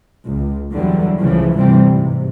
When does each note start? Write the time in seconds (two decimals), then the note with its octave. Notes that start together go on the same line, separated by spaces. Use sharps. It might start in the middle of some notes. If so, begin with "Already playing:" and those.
0.25 C#2
0.71 E2 D3 F#3 G3
1.18 C#2 A2 C#3 E3 F3
1.56 D2 G2 C3 E3 G3 C4
1.90 G#2 C3